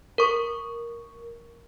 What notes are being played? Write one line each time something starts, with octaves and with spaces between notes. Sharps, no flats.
A#4 C#6